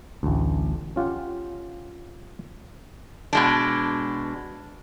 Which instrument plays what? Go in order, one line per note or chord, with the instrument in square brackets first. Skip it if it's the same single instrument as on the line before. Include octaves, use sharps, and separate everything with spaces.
[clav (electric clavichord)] A1 D2
C#4 F4 G4 F#5
[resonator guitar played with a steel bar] B2 G#3 D4